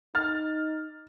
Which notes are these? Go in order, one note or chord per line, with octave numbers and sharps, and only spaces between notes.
D#4 F6 A6